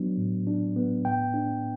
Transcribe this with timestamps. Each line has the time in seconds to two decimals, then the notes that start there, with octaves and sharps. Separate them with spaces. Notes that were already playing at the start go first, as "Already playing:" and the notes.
Already playing: F#3 B3 D4
0.17 A2
0.47 D4
0.76 B3
1.05 A2 G5
1.34 D4